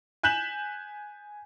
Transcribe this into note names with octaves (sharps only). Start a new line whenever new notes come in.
G#5 F#6 G6 B6 E7 F#7